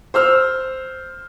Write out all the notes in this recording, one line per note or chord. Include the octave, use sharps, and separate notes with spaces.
C5 E6 F6